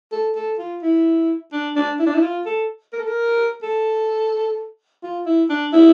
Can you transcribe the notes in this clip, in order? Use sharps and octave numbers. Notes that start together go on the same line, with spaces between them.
A4
A4
F4
E4
D4
D4
E4
D4
E4
F4
A4
A#4
A4
A#4
A4
F4
E4
D4
E4